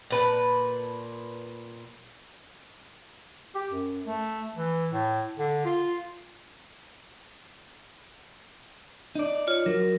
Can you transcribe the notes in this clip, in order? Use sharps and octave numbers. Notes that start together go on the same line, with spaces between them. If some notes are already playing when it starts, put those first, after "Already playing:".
A#2 B4 A5
G4
F#2
A3
E3
A2
D3
F4
D#4 D5
F4 C#5
F#3 A#4